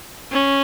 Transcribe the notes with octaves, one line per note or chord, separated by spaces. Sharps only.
C#4